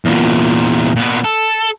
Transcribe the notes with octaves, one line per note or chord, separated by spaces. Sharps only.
E2 A#2
A#2 B3
A4